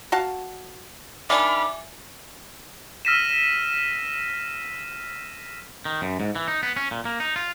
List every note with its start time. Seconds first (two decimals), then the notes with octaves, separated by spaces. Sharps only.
0.12 F#4 F5 A5
1.30 D#3 D4 E5 G#5 B5 D6 F6
3.05 E6 F6 A#6 B6 D#7 E7
5.85 D#3
6.02 F#2
6.20 G#2
6.35 E3
6.48 D#4
6.63 B3
6.76 C#4
6.91 A#2
7.05 A#3
7.20 D#4
7.36 F4